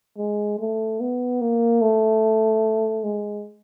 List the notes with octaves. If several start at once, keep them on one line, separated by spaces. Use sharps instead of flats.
G#3
A3
B3
A#3
A3
G#3